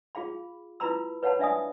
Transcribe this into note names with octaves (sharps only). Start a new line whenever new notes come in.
F4 G#4 F5 B5
E4 F4 B4 A#5 B5 E6
B4 C#5 F5 F#5 A5 B5
D4 D5 E5 F5 G#5 D#6